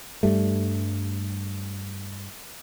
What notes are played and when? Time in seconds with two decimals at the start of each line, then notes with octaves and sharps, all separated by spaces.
0.23 G2 G3 A3